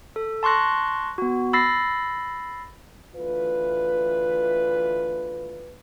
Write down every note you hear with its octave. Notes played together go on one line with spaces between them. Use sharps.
A4
A5 C6 C#6 F#6 A#6
B3 F#4
B5 E6 A6 A#6 C7
D2 E3 F4 B4